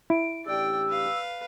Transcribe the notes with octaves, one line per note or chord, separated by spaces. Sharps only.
E4 D7
A1 D4 G4 D5 G5 E6
B4 F5